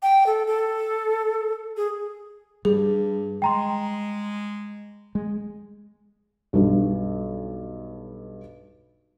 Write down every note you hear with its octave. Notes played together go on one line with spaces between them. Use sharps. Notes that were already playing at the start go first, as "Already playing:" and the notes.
G5
A4
A4
G#4
G2 G3 G#4
G#3 G5 A#5 C6
G#3
B1 G2